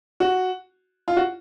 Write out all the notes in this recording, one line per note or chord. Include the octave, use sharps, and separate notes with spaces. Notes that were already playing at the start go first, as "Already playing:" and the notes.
F#4
F4
F#4